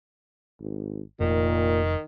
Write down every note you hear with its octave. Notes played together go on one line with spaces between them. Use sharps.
G#1
F1 A#2 D#3